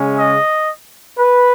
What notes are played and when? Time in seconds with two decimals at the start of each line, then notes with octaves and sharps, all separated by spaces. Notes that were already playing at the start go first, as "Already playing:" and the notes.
Already playing: C#3 G#3 C#4
0.17 D#5
1.18 B4